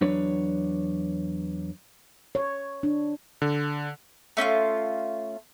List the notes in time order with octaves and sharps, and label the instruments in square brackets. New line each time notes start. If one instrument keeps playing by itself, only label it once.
[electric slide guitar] E2 F#3 D4 B4 C#5
[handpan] C#5
D4
[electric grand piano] D3
[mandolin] A3 C#4 E4 F4